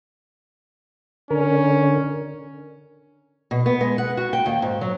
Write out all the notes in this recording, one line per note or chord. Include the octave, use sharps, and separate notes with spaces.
D3 C#4 A#4
B2
B3
G#3
F#5
F#4
G5
D#2
G#2
F#3